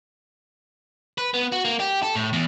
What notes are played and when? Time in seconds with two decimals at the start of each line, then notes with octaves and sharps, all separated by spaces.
1.18 B4
1.34 B3
1.52 F#4
1.65 A#3
1.80 G4
2.03 A4
2.15 A2
2.33 E2